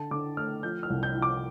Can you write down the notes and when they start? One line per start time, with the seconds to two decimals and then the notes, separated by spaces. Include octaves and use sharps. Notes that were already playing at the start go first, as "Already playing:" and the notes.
Already playing: D3 A5
0.11 D3 D6
0.37 A3 F6
0.63 F3 G6
0.83 F6
0.90 C2
1.03 G6
1.15 F3
1.22 D6